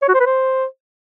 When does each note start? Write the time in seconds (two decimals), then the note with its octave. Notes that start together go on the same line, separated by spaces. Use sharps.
0.02 C#5
0.08 F#4
0.14 C5
0.20 B4
0.26 C5